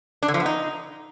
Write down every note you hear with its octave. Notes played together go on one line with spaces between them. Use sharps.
D4
D3
F3
B3
D#4